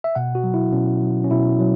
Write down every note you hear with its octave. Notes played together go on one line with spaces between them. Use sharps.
E5
B2 F#5
F#4
F#3
E4
B2 C#4
F#3
C#4
B2 E4
F#3